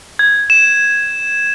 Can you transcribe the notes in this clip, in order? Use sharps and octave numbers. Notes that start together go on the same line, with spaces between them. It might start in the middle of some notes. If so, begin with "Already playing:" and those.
G#6
E7